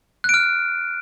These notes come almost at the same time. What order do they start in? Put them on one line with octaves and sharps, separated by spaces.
F#6 D7 F6